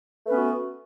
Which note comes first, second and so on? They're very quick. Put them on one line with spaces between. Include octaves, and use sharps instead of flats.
A3 B4 C#4 B3 F#4